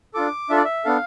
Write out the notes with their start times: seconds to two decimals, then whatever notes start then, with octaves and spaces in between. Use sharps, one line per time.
0.14 D4 F4 A4 D6
0.50 D4 F4 A4 E5
0.57 D5
0.65 E5
0.85 B3 D4 A4 F5